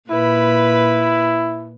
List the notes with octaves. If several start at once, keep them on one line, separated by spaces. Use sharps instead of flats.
A#2 E4 B4